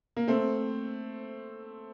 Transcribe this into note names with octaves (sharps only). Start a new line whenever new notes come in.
A#3
A3 C4